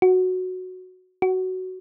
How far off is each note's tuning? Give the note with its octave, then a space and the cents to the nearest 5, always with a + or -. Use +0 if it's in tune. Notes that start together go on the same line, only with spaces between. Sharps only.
F#4 -5
F#4 +10